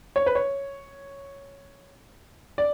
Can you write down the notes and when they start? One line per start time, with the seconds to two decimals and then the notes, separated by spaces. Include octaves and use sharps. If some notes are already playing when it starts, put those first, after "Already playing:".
0.16 C#5
0.26 B4
0.35 C#5
2.58 D5